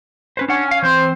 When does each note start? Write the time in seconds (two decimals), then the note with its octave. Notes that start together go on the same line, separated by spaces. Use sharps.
0.37 C#4 B4 C5
0.48 C#4 D4 F#5
0.68 F5 G#5
0.82 E3 C4 C5